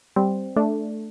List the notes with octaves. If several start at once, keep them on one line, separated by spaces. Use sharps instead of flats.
G3 C4
A3 D4